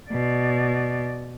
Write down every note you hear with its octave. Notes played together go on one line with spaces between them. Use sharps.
B2 D5